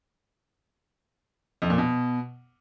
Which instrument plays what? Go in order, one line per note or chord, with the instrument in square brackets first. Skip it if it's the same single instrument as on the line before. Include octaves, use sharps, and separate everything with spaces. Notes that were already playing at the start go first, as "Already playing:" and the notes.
[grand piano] F2
A#2
B2